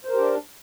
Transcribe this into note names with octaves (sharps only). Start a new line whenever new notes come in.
D4 G4 A#4 C5